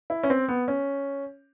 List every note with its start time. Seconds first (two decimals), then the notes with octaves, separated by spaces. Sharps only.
0.10 E4
0.23 C#4
0.30 C4
0.48 B3
0.68 C#4